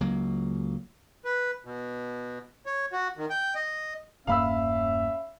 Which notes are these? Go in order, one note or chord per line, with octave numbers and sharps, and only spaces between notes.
C#2 F#3 A#3
B4
B2
C#5
F#4
D#3
G5
D#5
E1 G2 A#3 C#4 E5 F5 B5 E6